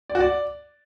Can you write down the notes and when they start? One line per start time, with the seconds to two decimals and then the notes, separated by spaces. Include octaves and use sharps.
0.10 D5
0.15 F#4
0.20 D5